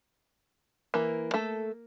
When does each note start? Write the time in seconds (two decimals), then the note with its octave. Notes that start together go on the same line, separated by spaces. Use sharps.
0.94 E3 A#3
1.34 A3 A4